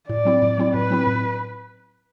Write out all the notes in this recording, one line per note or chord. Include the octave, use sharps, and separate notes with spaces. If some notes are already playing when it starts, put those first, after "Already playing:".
A2 D5
F#3 C4 E4
A2
F#3 C4 E4
A2 B4
F#3 C4 E4
A2